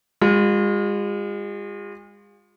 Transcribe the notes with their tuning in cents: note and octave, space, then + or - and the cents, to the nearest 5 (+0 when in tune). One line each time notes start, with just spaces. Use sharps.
G#3 -40 F4 +30